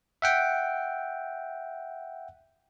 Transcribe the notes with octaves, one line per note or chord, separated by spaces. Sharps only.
E5 F#5 G5